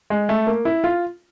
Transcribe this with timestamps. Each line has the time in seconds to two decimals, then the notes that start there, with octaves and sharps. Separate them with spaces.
0.10 G#3
0.29 A3
0.47 A#3
0.65 E4
0.84 F4